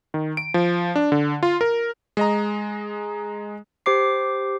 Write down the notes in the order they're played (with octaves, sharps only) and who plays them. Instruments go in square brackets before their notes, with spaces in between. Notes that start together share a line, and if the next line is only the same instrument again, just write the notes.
[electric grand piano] D#3
D7
F3
D4
D3
F4
A#4
G#3 D#5 A#5
[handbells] G4 C5 D6 C7